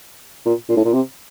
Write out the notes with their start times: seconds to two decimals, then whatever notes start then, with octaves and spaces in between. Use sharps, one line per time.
0.46 A#2
0.69 A#2
0.77 A2
0.85 A#2
0.93 C3